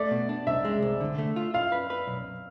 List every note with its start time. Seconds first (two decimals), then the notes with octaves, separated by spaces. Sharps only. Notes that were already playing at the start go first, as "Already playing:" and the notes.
Already playing: A3 D5
0.11 B2
0.29 D4
0.47 C2 E5
0.65 G#3
0.82 C2
1.00 D3
1.18 A3
1.36 F4
1.54 F4 F5
1.72 B4
1.90 B4
2.07 B1